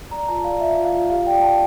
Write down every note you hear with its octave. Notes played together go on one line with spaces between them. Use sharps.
D5 A#5
F4 A5
D5 F5
F4 E5
F4
F5
F4
G4 F5
D5 G5
D5 A5